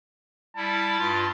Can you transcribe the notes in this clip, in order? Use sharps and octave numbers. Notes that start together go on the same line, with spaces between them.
G3 E4 A5
G2 F4